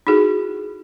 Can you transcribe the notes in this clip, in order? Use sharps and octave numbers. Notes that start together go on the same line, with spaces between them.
D#4 E4 F#4 G#4 A4